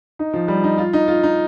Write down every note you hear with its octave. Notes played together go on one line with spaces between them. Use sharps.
D#4
F3
G3
D#4
F4
D#4
F4
D#4